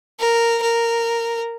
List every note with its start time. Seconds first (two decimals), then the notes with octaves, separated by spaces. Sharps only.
0.19 A#4
0.62 A#4